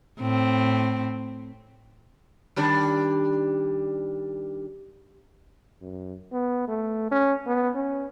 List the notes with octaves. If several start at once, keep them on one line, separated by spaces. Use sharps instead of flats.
A2 C4
D#3 G3 D4
F#2
B3
A3
C#4
B3
C#4